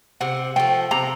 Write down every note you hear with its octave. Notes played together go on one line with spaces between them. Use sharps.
C3 F#5
F3 A3 G5
C3 A#5